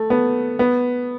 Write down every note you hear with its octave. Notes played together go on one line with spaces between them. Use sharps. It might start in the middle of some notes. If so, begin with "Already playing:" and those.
Already playing: A3
B3
B3